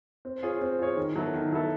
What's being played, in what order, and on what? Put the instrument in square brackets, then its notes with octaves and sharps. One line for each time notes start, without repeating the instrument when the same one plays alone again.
[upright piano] C4
F4 G#4 C#5
C4
F4 G#4 C#5
D#3
F#3 B3 E4 A4
D#3
F#3 B3 E4 A4